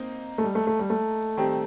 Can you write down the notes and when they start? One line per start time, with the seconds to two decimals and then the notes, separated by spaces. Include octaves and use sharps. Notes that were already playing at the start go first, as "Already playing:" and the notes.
Already playing: A#3 C4 D#4
0.38 A3
0.44 G3
0.55 A3
0.67 A3
0.79 G3
0.90 A3
1.37 D#3 G3 C4 G4